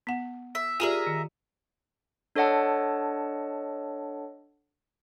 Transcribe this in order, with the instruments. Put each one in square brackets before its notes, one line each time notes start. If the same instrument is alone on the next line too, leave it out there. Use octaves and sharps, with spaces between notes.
[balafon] B3 F#5
[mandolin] E5
[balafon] F4 G4 D5 [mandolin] G#4 A#4 E5
[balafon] D#3
[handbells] D4 A4 C#5 D#5 F#5 A5